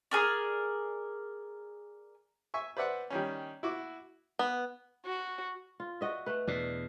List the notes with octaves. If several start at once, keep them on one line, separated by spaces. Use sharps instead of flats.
G#4 A#4 D5
E5 G#5 C#6
B4 C5 D5 E5 F#5
D#3 G3 C#4
E4 F#4 D6
B3
F#4
F4
F#4 D#5 E5
A3 B4
E2 B2 D4